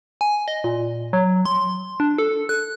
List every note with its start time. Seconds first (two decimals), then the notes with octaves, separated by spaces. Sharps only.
0.21 G#5
0.48 D#5
0.64 A#2
1.13 F#3
1.45 C6
2.00 D4
2.18 A4
2.49 F#6